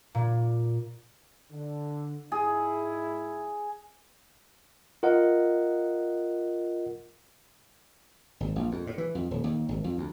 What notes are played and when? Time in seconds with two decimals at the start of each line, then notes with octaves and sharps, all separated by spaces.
0.15 A#2
1.51 D3
2.32 G#2 E4 G#4
5.03 F4 A#4 D#5 F#5
8.40 G#1
8.56 A#1
8.72 F2
8.87 A2
8.98 E3
9.15 F2
9.31 D#1
9.44 D#2
9.69 G#1
9.84 F2
9.98 D2